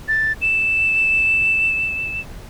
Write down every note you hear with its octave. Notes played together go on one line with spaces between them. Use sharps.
A6
E7